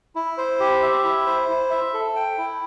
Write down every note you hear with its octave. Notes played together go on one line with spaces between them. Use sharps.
E4
C5
G4
E5
E4
C5
E4
E5
A4
G5
E4